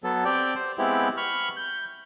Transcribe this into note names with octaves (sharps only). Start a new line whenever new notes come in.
F#3 B3 A4
C4 G4 D5 G5
C5
G#3 B3 C4 E4 G4
B5 C#6 F6
G6